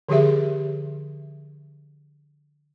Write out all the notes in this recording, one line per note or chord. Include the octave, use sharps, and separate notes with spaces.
D3 F3 G4 G#4 E5